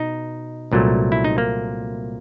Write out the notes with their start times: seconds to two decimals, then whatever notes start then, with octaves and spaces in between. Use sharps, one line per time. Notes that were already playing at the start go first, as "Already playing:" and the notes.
Already playing: B2 D#4
0.72 C2 A#2 F#3 A3
1.12 E4
1.24 D#4
1.38 A#3